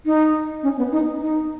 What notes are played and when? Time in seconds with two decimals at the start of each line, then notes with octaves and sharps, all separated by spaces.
0.06 D#4
0.63 C#4
0.78 B3
0.92 D#4
1.22 D#4